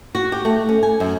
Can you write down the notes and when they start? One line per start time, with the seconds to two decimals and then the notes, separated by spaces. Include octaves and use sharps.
0.15 F#4
0.32 G4
0.45 A3
0.69 C#4
0.83 G#5
1.00 F#2